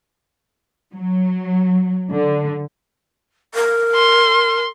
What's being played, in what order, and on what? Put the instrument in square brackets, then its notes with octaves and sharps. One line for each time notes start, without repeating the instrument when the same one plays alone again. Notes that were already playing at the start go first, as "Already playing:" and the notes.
[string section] F#3
D3
[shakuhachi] A#4
[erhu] C6